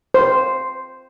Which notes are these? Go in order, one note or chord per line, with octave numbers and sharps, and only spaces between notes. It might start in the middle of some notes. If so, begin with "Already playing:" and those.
C5